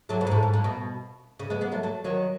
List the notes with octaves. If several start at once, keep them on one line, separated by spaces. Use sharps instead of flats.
F#3 A3
B2
G#2
A2
G#2
A2
B2
C#3
G#3 B3
G#3 B3
F#3 A3
F#3 A3
D#3 F#3